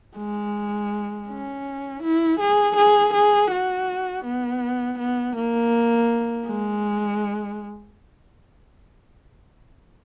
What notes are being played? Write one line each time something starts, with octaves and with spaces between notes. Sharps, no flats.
G#3
C#4
E4
G#4
G#4
G#4
F#4
B3
B3
A#3
G#3